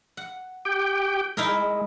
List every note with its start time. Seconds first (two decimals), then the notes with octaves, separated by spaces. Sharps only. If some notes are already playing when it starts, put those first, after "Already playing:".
0.17 F#5
0.65 G4 G5
1.37 G#3 D#4 E4 A#4